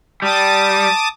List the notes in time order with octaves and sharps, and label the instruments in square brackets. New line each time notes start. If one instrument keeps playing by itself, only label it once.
[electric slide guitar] G3 [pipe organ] A5 D6 D#6